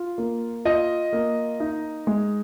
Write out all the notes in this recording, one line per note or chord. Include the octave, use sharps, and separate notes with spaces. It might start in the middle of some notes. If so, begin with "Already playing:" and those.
Already playing: F4
A#3
F4 D#5
A#3
D#4
G#3